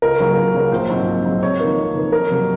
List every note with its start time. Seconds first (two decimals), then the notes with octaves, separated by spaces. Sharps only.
0.02 C#2 A#4
0.20 C#3 F#3 A#3
0.37 C#2
0.54 C#3 F#3 A#3
0.72 A#1 C5
0.90 G#2 F#3 C4
1.07 A#1
1.25 G#2 F#3 C4
1.43 F2 C#5
1.60 D#3 A#3
1.77 F2
1.95 D#3 A#3
2.12 F2 A#4
2.30 C3 F#3 A#3